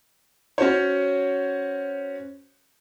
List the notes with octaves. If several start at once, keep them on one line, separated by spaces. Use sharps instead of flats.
C#4 F#4 C5 C#5